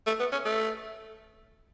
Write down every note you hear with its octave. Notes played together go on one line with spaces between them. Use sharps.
A3
B3
C#4
A3